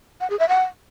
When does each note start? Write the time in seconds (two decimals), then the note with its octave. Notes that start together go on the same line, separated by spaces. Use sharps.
0.21 F#5
0.30 G#4
0.39 E5
0.49 F#5